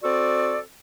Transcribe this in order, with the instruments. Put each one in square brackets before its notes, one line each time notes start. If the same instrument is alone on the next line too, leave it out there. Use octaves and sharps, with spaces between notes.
[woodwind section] C4 F#4 A4 D5